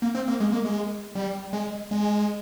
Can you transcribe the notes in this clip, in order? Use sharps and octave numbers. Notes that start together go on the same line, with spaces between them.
A#3
C4
A#3
G#3
A#3
G#3
G3
G#3
G#3